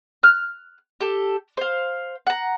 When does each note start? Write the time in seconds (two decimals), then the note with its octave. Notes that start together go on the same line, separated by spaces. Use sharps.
0.23 F6 F#6
1.01 G4 A4
1.57 C5 F5
2.27 F#5 A#5